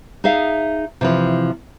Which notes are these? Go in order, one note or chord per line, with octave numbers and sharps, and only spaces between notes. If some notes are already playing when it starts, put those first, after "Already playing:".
D#4 G#4 E5 F5
C3 E3 F3